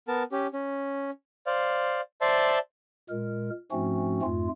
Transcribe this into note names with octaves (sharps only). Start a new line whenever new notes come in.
B3 A#4 A5
C#4 G4
C#4
C5 D5 F5
C5 D5 E5 A5 C6
A#2 G#3 A#4
G#2 F3 A3 C4 C#4 F#4
F2 G#2 A3 F4